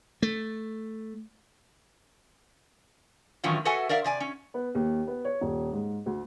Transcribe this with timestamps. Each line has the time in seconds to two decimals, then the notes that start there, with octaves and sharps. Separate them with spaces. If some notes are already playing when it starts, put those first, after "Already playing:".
0.22 A3
3.44 A2 D#3 E3 F#3 C#4 F4
3.65 F#4 A4 B4 E5 F#5 G#5
3.89 A#4 D5 E5 F5
4.04 C3 D5 G#5
4.20 C#4
4.54 B3
4.75 D#2
5.07 B3
5.25 C#5
5.41 D#1
5.72 G#2
6.06 D2